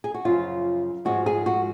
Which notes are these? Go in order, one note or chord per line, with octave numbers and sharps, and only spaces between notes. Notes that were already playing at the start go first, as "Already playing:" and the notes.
G#4
F#4
F#2 C#3 F3 F4
G#2 F3 G#3 F#4
G#4
F#4